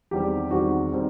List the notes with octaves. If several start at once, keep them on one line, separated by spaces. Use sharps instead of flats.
E2 D#3 G3 C4 G4
E2 D#3 G3 C4 F#4
D#3 G3 C4